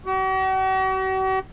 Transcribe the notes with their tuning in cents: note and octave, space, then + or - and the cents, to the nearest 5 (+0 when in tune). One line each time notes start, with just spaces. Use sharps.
F#4 +45